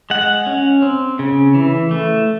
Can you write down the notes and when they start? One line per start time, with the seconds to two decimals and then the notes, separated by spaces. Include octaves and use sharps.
0.10 G#3 F#5
0.47 C#4
0.82 C4
1.19 C#3
1.55 E3
1.91 A3